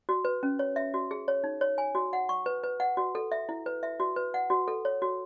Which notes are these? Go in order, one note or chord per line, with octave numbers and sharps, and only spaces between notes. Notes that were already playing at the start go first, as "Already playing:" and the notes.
F#4
B4
C#4
C#5
E5
F#4
G#4
C#5
D#4
C#5
G#5
F#4
F#5
C#6
B4
B4
F#5
F#4
A4
E5
E4
B4
E5
F#4
B4
F#5
F#4
A4
C#5
F#4